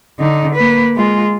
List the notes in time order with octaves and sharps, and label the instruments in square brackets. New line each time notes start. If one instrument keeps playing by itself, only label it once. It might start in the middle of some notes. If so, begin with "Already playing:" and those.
[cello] D3 D#4
A#3 B4
G#3 F4